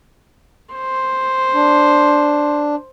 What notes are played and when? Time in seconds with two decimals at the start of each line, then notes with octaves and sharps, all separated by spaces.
0.75 C5
1.54 D4